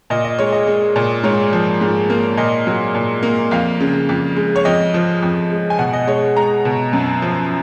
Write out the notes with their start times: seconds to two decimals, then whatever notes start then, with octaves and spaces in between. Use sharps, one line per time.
0.10 A#2 D#5
0.24 D#5
0.39 G#3 C#5
0.53 D#5
0.67 G#3
0.96 A#2
1.23 G#2 C#5
1.53 F3
1.81 G#2
2.10 A#3
2.37 A#2 D#5
2.67 F#3
2.95 A#2
3.23 A#3
3.51 F2 F5
3.80 C#3
4.09 F2
4.36 G#3
4.56 C#5
4.65 F2 D#5
4.94 F3
5.23 F2
5.51 G#3
5.70 G#5
5.79 B2 F#5
5.93 D#5
6.07 G#3 C#5
6.36 G#3 A#5
6.65 B2
6.93 F#2
7.22 F3